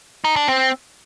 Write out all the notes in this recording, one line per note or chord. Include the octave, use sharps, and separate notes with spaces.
D#4
D4
C4